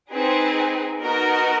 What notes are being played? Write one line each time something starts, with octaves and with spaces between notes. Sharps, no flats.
C4 D#4 G#4 B4
B3 D#4 F#4 A#4 D#5